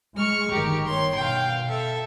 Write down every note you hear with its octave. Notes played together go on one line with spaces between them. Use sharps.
G#3 C#6 F6
G1 D#3 G4 A#4
C#5 C6
B2 F5 G5
A4 E5